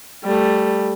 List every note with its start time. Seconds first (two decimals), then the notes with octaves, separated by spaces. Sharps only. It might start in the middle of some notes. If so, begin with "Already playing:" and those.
0.24 G3 A3